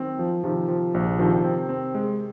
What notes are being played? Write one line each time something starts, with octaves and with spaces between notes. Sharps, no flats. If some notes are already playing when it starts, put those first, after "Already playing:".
Already playing: D#3 F#3 C4
F3
C3 D#3 F3
F3
A#1
C3 D#3 F3
C4
C4
G#3